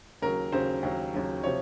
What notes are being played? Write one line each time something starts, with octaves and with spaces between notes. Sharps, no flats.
D#2 C#3 F#3 A#4
D#2 C#3 F#3 C5
D#2 C#3 F#3
D#2 C#3 F#3
C3 F3 C#5